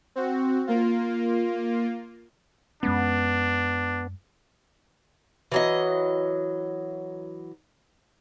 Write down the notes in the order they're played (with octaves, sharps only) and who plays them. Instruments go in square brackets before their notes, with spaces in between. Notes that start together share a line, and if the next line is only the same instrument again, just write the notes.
[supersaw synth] C4 F#4
A#3 F4
[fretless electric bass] F#2 G#3 C#4 [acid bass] B3 [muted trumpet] D4
[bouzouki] E3 F#3 D#5